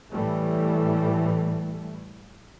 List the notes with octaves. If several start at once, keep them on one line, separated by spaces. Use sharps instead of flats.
A2 E3 G3 A3